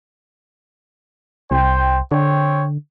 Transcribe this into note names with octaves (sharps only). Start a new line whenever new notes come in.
C2 C5 G5
D3 C4 C#5 G5